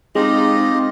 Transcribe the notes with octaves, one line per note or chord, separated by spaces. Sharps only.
G#3 C4 D#4 F4 G4 D#5